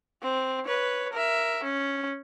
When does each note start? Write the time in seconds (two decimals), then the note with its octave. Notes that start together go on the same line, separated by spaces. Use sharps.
0.22 C4
0.66 B4 C#5
1.13 A#4 E5
1.63 C#4